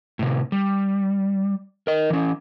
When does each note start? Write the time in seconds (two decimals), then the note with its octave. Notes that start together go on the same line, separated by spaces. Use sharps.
0.19 A2 C3
0.52 G3
1.87 A#4 D#5
2.10 E3 C#4